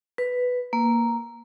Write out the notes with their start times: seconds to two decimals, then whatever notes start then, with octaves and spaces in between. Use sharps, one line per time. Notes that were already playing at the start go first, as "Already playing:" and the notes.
0.18 B4
0.73 A#3